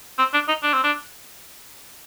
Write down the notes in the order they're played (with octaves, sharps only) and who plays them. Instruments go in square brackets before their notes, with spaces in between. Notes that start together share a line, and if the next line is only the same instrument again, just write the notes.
[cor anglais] C4
D4
D#4
D4
C4
D4